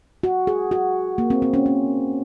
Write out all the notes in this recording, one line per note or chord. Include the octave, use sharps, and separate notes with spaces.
F#4
G#4
F#4
A#3
C4
C4
C#4
C#4